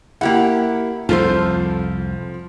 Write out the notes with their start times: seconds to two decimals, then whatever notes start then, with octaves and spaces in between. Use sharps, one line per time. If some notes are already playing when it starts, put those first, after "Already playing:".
0.21 A#3 E4 G4 F#5
1.09 C2 F2 F3 F4 A4 C5